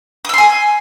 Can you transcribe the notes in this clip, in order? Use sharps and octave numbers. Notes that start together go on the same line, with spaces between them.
G#5 C6 D#6 E6